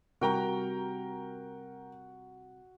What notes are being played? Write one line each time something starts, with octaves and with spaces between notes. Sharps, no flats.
C3 G3 F#4 A#4 G5 A#5